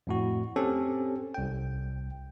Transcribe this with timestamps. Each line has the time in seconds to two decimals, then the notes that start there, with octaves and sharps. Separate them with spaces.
0.07 F2 A2 F#4
0.56 C4 C#4 G4 A4
1.34 C2 G5